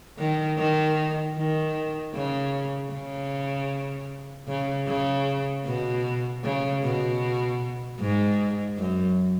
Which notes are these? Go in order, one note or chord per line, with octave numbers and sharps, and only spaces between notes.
D#3
D#3
D#3
C#3
C#3
C#3
C#3
B2
C#3
B2
G#2
F#2